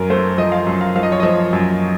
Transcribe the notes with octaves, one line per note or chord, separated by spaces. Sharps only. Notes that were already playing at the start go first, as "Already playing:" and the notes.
Already playing: F#2 A#4
A3 C5
F3 D#5
F5
F#2
F5
F3 F5
D#5
C#5
F3 D#5
F#2